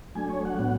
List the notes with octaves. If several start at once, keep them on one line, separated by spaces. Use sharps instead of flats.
F#3 A3 D4 G#5
C#5
F#5
A2 F#3 B3 F#5